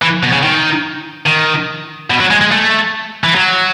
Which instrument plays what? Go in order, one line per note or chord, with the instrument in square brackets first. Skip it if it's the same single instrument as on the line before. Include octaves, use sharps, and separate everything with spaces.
[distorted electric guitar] E3
B2
C#3
D#3
D#3
B2
F#3
G#3
G#3
A3
E3
F#3